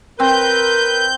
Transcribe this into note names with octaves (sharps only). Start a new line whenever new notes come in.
C4 A#4 B4 G6